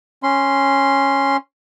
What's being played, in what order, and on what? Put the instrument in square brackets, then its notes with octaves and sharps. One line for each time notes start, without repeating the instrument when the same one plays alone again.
[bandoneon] C#4 C6